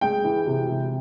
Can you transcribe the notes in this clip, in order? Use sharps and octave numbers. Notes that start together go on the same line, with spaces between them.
G#3 G5
E3
C3
C3